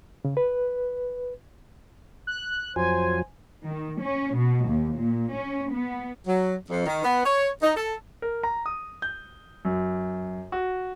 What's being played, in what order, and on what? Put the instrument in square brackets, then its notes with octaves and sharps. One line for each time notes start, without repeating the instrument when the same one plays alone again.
[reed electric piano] C#3
B4
[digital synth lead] F#6
[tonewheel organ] F2 F3 F#3 [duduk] C5 [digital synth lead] G#5
[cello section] D#3
C#4
B2
D#2
A#2
C#4
B3
[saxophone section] F#3
F2
D#3
B3
C#5
D#4
A4
[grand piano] A#4
A#5
D#6
G6
F#2
F#4